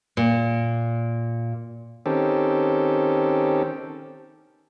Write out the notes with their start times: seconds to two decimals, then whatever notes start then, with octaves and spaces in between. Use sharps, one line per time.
0.17 A#2
2.06 D#3 C4 C#4 G4 A4